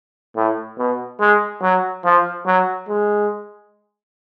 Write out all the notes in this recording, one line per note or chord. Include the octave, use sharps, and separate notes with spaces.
A2
B2
G#3
F#3
F3
F#3
G#3